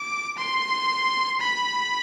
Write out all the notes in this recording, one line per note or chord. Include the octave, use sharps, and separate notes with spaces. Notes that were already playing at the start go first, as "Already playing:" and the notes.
Already playing: D6
C6
B5